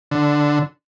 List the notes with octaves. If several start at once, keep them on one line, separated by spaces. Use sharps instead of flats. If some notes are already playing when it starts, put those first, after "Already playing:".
D3